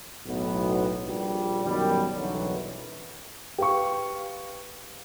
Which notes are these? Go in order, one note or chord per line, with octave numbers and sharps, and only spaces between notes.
B1 A2 B3
A#1 G3
F#2 B2 D#3 G3
B1 F#2 B2 D3 E3 F#3
G4 B4 F5 C#6